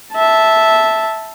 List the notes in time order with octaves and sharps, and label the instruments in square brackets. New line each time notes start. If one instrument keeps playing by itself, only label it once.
[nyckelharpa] E5 A5